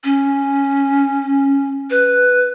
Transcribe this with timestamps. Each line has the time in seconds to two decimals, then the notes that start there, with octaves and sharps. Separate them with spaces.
0.04 C#4
1.90 B4